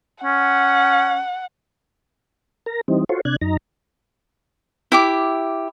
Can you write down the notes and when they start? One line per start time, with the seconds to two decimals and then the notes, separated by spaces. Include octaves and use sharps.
0.24 C#4 F#5
2.66 A#4 A#5
2.88 E3 G3 C4 D#4
3.09 F4 F#4 A4 C5 C#5
3.25 C3 D4 F#6 G#6
3.41 F#2 D#4 A#5
4.92 E4 G4 D6